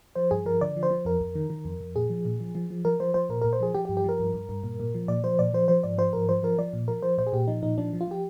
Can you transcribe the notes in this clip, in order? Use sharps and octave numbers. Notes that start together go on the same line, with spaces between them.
F3 C5
G2 G#4
F3 A#4
D3 D5
F3
C5
F3
F2 A#4
F2
D#3
D#3
F2
F2
A#2 G#4
F3
A#2
F3
F3
F3
F3 A#4
F3 C5
F3 C5
A#2 A#4
A#2 A#4
C5
F3 G#4
F3 G4
G4
G2
G4
F3 A#4
G2
G2
G2
A#2
A#2
F3
A#2 D5
F3 C5
A#2 D5
F3 C5
F3 C5
G#2 D5
F3 C5
G#2 A#4
F3 C5
F3 A#4
F3 D5
A#2
F3 A#4
F3 C5
A#2 C5
G#4
A#2 G4
F3 D#4
A#2 D#4
F3 D4
F3
F4
F3 G4